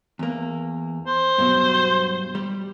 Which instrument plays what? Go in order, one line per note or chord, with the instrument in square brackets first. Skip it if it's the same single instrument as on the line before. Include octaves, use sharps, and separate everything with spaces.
[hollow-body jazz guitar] E2 A#3
[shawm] C5
[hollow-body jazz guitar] G2 B2 F#3
G3